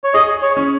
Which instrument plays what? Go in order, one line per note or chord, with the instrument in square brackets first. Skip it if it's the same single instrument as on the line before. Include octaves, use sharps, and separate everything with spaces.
[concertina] C#5
[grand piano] G#4 [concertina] D#5
[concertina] C#5
[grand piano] C#4